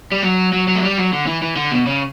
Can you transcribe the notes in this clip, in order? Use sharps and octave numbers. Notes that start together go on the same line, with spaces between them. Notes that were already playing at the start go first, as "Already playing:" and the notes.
G3
F#3
F#3
F#3
A3
G3
F#3
D3
E3
E3
D3
B2
C#3